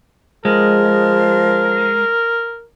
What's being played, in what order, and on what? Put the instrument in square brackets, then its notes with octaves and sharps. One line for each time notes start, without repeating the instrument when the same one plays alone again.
[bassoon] F3 [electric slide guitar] G#3 [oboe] A#4